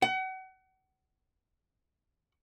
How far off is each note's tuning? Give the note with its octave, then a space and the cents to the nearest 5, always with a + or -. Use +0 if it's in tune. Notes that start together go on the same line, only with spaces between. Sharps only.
F#5 +35